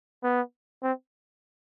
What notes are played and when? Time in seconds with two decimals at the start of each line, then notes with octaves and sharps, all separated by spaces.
0.23 B3
0.83 C4